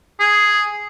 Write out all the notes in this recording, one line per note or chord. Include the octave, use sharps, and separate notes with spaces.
G#4